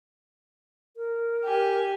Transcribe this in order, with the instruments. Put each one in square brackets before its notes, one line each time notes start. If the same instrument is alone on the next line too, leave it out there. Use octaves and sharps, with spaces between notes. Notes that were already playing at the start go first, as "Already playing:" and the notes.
[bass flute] A#4
[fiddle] G4 G#5